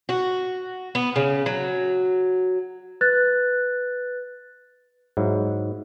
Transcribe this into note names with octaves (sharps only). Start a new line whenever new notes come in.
F#4
B3
C#3
F#3
B4 F#6 A6
G#2 F#3 E4